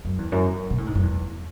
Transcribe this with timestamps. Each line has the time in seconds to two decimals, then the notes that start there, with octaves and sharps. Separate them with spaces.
0.05 F#2
0.18 E2
0.32 F#2
0.70 B2
0.78 A2
0.86 G#2
0.95 F#2
1.03 E2